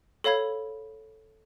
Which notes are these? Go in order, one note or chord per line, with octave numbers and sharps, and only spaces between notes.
A4 C#5 F5 B5 G#6